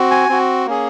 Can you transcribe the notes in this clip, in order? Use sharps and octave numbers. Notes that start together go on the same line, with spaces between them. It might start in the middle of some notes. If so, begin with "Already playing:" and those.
Already playing: C4 F#4
G#5
C4 F#4
A#3 C#4 G#4